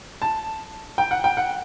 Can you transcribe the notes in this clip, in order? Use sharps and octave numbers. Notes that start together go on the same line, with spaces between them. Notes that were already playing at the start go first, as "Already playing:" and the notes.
A5
G5
F#5
G5
F#5